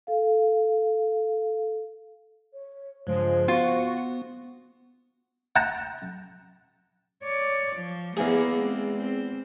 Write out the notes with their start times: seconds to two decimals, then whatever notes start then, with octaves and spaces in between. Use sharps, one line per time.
0.07 A4 F5
2.53 C#5
3.07 G2 C#3 F3 G#3 C5
3.48 B3 F4 F#4 C#6
5.56 F#5 G5 A5 A#5
7.23 C#5 D5
7.77 F3
8.17 E2 A#3 B3 G#4
8.54 G#3 C4
8.99 C4